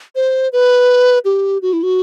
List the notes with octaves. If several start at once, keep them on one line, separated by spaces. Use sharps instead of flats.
C5
B4
G4
F#4
E4
F#4